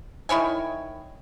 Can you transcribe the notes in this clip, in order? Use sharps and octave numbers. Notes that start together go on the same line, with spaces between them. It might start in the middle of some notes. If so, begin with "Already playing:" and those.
D#3 E4 C#5 G#5